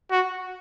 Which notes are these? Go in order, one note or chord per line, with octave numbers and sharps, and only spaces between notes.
F#4